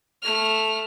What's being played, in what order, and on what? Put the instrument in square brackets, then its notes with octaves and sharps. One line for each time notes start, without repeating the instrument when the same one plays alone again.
[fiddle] A3 F6